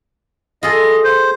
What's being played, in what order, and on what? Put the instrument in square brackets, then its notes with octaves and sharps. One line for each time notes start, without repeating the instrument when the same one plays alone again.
[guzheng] F4 G#4 A4 [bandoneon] D#5
[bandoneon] C5